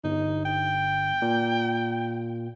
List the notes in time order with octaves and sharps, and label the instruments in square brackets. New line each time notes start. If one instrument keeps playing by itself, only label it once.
[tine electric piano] G1 [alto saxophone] D#4
[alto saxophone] G5
[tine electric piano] A#2